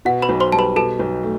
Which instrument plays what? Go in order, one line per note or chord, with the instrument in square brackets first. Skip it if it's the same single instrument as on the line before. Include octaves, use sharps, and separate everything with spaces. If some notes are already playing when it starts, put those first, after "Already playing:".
[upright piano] B2 [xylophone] F#5
[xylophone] B4 B5
[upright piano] B1
[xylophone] C5 C6
[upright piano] G3 [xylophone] A5
[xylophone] B4 B5
[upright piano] B2 [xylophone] A4 A5
[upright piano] B1
A3